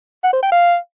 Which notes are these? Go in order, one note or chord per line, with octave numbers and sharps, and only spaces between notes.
F#5
C5
G5
F5